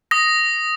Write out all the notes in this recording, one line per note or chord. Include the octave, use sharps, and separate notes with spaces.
D#6 A#6